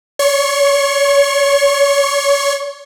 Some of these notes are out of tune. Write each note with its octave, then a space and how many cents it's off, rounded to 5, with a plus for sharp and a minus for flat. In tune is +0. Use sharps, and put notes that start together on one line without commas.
C#5 +30 C#6 -35